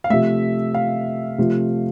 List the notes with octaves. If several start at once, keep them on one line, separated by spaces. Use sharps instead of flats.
F5
C3 F3 A3 E5
F5
C3 F3 A3